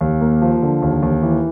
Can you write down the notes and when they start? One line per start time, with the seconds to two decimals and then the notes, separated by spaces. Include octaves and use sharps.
0.01 D#2
0.21 A#3
0.42 F3
0.62 D3
0.82 D#2
1.02 D#2
1.23 E3